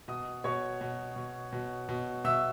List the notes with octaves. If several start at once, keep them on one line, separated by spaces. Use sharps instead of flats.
B2 D#5 D#6
B2 C#5 C#6
B2
B2
B2
B2
B2 E5 E6